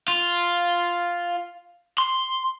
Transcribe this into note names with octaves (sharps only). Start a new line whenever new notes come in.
F4
C6